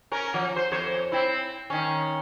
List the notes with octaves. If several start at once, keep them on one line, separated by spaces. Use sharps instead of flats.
C#4 A#4
F3
C5
F2 C5 C#5
C4 E4
D#3 C#4